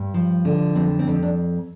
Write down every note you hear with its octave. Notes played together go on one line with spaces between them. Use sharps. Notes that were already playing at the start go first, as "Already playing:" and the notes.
Already playing: G2
F3
D3
F2 C4
C4
F2
D4